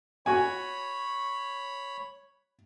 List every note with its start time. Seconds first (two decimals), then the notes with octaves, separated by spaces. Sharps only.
0.26 F#4 C#5 G#5 B5